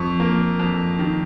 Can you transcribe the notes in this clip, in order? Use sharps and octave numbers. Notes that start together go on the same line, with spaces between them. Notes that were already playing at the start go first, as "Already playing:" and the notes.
Already playing: F2 C#6
A#3
F2
D#3